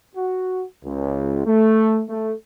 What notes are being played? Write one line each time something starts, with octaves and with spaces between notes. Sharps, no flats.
F#4
C#2
A3
A3